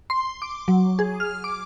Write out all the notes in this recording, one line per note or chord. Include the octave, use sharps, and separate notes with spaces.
C6
D6
F#3
G#4
F6
D6